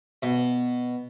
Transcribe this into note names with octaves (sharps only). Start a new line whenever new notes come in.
B2